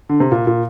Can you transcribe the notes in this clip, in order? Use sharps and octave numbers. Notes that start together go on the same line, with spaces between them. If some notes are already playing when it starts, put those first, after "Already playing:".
D3
C3
A#2
A#2